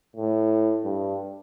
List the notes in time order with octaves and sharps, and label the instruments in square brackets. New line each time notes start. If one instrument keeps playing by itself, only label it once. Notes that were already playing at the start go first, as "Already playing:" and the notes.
[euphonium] A2
G2